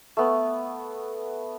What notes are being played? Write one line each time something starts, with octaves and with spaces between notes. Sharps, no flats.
A3 B3